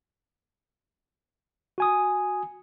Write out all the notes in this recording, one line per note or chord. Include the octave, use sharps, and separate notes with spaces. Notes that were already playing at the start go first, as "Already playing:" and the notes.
F#4 G#5 D#6